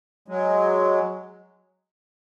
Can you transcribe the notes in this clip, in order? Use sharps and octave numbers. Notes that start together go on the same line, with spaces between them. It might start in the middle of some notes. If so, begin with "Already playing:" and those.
F#3 G#3